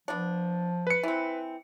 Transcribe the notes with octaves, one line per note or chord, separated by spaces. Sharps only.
F3 B3 D4
B4 C#7
E3 C4